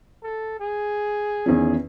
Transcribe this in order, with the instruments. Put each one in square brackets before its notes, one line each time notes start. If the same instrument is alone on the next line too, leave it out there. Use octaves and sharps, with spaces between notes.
[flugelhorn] A4
G#4
[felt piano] E2 D#3 C#4